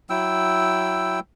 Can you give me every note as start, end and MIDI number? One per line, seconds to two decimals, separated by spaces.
0.10 1.20 54
0.10 1.20 64
0.10 1.20 79
0.10 1.20 88